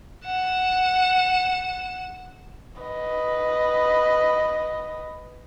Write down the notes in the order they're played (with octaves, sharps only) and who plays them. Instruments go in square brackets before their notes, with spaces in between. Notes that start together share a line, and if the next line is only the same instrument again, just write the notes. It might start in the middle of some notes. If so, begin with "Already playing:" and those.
[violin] F#5 E7
[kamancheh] B4 D#5